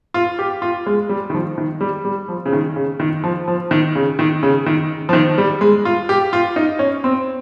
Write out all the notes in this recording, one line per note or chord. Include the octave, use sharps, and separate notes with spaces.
F4
G4
F4
G#3
G3
D#3
F3
D#3
G3
G3
F3
C#3
D#3
C#3
D#3
F3
F3
D#3
C#3
D#3
C#3
D#3
F3
D#3
G3
G#3
F4
G4
F4
D#4
C#4
C4